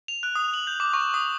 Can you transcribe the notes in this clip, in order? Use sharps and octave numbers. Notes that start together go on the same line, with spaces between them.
F7
F#6
D#6
F#7
G6
D6
C#6
D#6